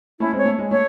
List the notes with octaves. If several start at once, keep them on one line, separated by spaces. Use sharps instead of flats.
A3 C#4 E4
G#3 C4
C#5
A3
G#3
A3 C#5